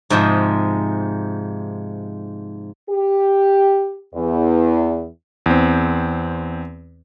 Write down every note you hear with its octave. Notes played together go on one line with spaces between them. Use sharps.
G#2 C3 F3 G#3
G4
E2
E2 C4